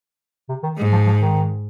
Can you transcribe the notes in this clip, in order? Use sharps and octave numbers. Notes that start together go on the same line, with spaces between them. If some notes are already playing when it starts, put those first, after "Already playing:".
C3
D#3
G#2
F3
F3
D#3